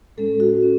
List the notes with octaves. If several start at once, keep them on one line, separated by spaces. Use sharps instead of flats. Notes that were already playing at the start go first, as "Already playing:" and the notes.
A2 G#3 C#4 A4
F#4
C#4